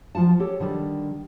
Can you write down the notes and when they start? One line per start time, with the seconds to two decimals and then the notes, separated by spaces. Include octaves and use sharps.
0.15 F3 F4 F#5 A5
0.39 G4 A4 C#5
0.60 D3 D#3 G3 A4